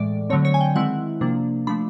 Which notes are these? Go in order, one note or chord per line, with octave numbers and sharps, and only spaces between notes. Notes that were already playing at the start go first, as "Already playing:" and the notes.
Already playing: A2 E3 G#3 D5
D3 F#3 A3 C4 C#5
C#5
G#5
G5
D#3 G#3 C4 E4 F#5
C3 F3 A#3 D4
F3 A3 D4 B5